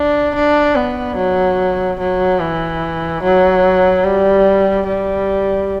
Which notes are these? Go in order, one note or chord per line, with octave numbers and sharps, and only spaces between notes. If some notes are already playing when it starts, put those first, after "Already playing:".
Already playing: D4
D4
B3
F#3
F#3
E3
F#3
G3
G3